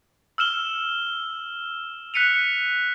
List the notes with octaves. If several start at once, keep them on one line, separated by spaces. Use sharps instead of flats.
E6 F6 E7 G7
F#6 B6 C#7 D#7 F7